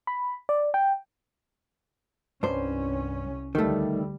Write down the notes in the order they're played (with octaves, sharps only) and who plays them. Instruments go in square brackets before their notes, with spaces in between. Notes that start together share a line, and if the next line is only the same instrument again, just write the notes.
[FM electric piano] B5
D5
G5
[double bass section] C2 C#4 [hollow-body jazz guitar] G2 C5
[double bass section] D2 G3 [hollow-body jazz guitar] D#3 A3